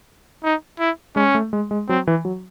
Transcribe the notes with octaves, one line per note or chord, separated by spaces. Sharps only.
D#4
E4
G#3 C#4
A3
G#3
G#3
F#3 C4
E3
F#3